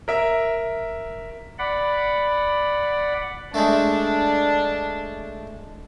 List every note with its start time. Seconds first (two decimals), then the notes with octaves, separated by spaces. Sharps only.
0.08 A#4 E5
1.58 D5 F#5 B5
3.54 G#3 A3 D4